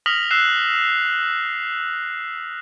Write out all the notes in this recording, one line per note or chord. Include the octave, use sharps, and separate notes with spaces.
D#6 F6 A#6 B6 F7 F#7
E6 F#6 C7 E7